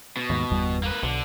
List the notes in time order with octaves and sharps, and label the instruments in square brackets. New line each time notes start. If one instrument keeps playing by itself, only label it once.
[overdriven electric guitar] B2
[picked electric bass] D#2 G#2
G1 E2 G3
[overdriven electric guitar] A#3 B4
[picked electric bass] B1 [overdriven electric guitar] D3